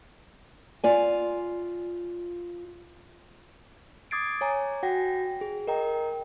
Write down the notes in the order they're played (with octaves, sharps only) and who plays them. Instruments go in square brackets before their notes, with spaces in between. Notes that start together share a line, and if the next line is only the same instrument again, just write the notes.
[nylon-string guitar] F4 D5 G#5
[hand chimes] D6 D#6 G#6 A6 C7 D7
C#5 G#5 A#5
F#4 F#5 G5 A#6
G#4
A#4 D#5 G5 A#5